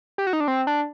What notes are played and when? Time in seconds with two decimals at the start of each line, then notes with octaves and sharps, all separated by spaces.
0.18 G4
0.27 F#4
0.33 D#4
0.40 D4
0.48 C4
0.67 D4